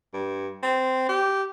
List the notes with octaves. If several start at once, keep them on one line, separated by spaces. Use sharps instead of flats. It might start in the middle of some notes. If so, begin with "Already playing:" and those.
G2
C4
G4